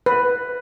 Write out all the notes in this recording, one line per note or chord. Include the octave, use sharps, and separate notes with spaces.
B4